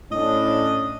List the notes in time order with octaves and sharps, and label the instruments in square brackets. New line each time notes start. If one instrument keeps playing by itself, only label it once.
[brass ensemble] A2 C#4 D4 [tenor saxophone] D#5